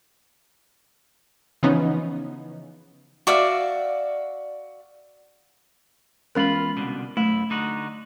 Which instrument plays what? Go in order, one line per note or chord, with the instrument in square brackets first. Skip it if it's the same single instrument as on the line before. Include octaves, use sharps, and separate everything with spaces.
[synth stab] C#3 E3 F3 B3 C#4 D#4
[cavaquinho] F#4 D5 E5 F5
[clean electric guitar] E2 F4 B5 [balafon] G#3 C#4 A#4
[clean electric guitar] C2 B2 D3
[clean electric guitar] F#2 E4 [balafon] A3
[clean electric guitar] D3 D#4 F#4